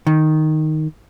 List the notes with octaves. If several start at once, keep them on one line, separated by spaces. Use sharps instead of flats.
D#3